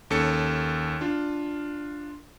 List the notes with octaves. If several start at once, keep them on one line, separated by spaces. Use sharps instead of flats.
D#2 C#4 A4 C#7
D4 F4